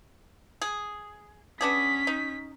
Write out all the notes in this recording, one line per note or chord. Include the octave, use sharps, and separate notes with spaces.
G#4
B3 C#4 D4 G#4 B6
D#4